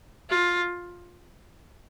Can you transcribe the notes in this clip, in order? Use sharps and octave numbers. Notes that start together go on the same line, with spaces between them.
F4